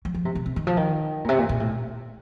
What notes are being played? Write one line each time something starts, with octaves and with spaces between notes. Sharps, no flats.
F#3
F3
C3
C3
C3
D#3
F3
D#3
A#2
C3
A#2
A#2
A2